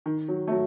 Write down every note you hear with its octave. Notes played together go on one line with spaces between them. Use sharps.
D#3
F#3
A3
F#3